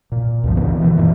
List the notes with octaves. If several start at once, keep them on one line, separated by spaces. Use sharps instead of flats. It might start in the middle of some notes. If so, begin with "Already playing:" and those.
A#2
C#2 G2 F3
D2 C#3 E3 B3
B2 D#3 E3
F#2 A#2 E3